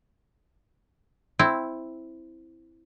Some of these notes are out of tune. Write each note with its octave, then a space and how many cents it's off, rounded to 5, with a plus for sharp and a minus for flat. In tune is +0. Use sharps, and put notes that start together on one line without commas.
C4 +0 E4 +0